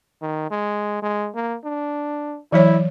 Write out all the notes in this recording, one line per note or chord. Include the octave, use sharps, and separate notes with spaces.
D#3
G#3
G#3
A#3
D4
E3 F#3 E4 C#5